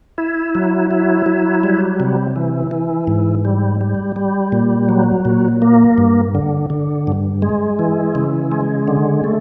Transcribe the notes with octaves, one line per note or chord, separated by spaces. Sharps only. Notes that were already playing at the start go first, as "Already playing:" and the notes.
E4
F#3
E4
F#3
G3
C3
E3
E3
G#2
G3
G3
G3
A#2
F#3
A#2
A#3
G2
D3
D3
G2
G#3
E3
C#3
G#3
D3
A3